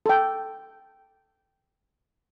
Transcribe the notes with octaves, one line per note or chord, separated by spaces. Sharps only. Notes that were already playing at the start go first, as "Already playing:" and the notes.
A4 G5